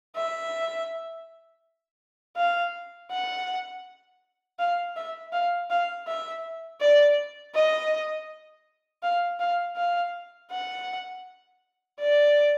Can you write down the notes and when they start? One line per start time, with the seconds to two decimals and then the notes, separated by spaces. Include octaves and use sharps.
0.16 E5
2.37 F5
3.11 F#5
4.59 F5
4.96 E5
5.33 F5
5.70 F5
6.07 E5
6.81 D5
7.55 D#5
9.03 F5
9.39 F5
9.76 F5
10.51 F#5
11.99 D5